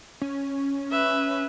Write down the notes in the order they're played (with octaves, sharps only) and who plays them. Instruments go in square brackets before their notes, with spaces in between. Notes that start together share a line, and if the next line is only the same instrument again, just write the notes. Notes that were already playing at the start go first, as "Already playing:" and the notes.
[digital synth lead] C#4
[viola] B4 E5